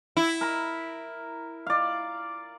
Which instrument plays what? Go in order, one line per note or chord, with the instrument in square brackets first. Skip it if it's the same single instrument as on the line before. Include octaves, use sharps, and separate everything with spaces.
[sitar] E4
[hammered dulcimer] A#4 B5
D5 F5